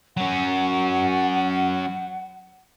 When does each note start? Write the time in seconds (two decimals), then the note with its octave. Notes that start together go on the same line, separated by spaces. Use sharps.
0.17 F#3 C#4 F#5